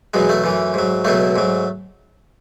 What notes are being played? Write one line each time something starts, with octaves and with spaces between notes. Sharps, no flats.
E2 B2 F#3 G#3
A3
F#2 E3
G#2 F#3
C#2 B2 F#3 A3
G#2 F#3